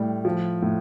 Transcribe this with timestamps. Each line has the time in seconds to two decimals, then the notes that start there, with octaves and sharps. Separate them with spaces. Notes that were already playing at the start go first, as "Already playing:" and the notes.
Already playing: A2 G3
0.25 F3
0.62 A2